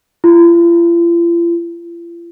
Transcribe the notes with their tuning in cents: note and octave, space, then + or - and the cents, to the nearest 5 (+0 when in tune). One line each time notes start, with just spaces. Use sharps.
F4 -45